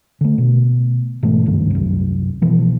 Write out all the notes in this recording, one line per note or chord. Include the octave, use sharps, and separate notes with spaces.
D3 A3
B2
G#2 B2 E3 A3
F#1 D2 G2 D#3
C2 F#2
B2 E3 F3